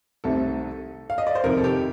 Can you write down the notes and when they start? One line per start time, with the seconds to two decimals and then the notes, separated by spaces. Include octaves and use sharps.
0.24 C2 C3 D#3 A3 A4
1.10 F5
1.18 D#5
1.27 D5
1.35 C5
1.44 F2 C3 D#3 A#4
1.57 A4
1.64 G4